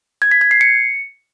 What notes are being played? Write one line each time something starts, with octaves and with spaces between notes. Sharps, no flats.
G#6
B6
G#6
C7
C#7